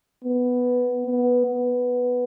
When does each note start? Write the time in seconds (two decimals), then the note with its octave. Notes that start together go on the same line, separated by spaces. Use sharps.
0.24 B3
1.06 B3
1.45 B3